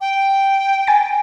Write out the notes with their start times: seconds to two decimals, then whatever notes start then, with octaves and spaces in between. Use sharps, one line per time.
0.01 G5
0.87 G#5 A6